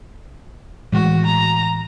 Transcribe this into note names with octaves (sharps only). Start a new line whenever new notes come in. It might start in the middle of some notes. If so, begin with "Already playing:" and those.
A2 E3 G#3 F#4
A#5